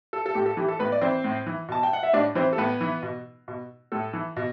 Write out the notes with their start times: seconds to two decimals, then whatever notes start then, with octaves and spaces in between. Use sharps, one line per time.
0.13 A4
0.26 A4
0.35 A2 G4
0.46 A4
0.57 E3 G4
0.68 A4
0.79 A2 B3 B4
0.92 D5
1.02 E3 C4 C5
1.24 A2
1.46 E3
1.68 B2 A5
1.83 G5
1.93 F#5
2.03 E5
2.13 A2 D4 D5
2.35 E3 C4 C5
2.53 A4
2.58 A2 B3 B4
2.81 E3
3.02 B2
3.48 B2
3.92 A2 A4
4.13 E3
4.36 B2